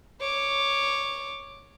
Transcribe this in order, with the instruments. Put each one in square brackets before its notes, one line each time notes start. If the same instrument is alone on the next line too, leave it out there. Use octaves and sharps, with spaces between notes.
[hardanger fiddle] C#5 D6